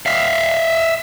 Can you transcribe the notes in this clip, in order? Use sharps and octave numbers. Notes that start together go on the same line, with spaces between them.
E5 F5